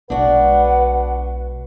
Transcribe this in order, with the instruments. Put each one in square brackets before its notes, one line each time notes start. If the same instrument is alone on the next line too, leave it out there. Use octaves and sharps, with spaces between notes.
[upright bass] B1 G#3 [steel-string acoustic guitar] D4 F#4 [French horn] B4 [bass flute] F#5